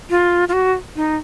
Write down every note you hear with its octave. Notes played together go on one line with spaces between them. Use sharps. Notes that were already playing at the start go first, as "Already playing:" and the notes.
F4
F4
F#4
D#4